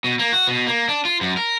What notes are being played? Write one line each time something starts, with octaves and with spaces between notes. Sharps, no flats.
B2
A#3
F#4
B2
A#3
D4
F4
F#2
A#4